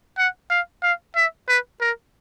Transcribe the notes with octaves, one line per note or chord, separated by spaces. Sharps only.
F#5
F5
F5
E5
B4
A#4